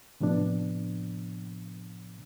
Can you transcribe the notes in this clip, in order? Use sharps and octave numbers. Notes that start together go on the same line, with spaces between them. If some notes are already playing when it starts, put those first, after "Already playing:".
A2 C3 F3 B3 D4